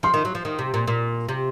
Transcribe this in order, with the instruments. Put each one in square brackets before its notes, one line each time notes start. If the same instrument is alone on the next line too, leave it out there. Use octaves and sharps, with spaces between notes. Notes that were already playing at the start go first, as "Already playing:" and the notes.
[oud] F3 [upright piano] C6
[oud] D#3
F#3
F3
D#3
C3
A#2
A#2
C3